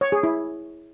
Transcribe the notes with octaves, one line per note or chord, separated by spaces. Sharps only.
C#5
G#4
E4